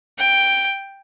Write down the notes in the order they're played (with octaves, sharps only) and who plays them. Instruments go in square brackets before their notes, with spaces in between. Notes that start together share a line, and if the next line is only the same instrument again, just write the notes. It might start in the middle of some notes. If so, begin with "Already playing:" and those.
[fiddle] G5